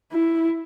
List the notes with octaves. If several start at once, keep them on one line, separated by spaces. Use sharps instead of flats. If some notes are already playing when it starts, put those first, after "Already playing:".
E4